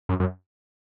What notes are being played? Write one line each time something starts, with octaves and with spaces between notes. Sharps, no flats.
F#2
F#2